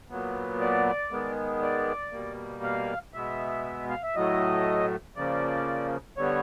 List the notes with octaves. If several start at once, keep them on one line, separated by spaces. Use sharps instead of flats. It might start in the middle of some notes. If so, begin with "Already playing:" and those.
A#2 F#3 B3
D5
D#3 G#3 B3
D5
B2 G3 A#3
F5
B2 G#3 B3 E5
F5
E5
A2 F#3 A3 D#5
C#3 F3 A#3 D5
D3 G3 B3 C#5